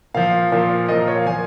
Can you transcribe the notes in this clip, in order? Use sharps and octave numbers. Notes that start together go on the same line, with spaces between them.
A#2 F3 F5
A#2 F3
A#2 F3 D#5
A#4
C#5
F5
A#2 F3 G#5